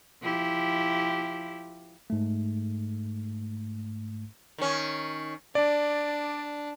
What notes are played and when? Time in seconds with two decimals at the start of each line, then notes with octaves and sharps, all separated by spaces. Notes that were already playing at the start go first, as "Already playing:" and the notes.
0.22 F3 E4 G4
2.10 G#2 A3
4.58 D#3 C#4
5.55 D4 D5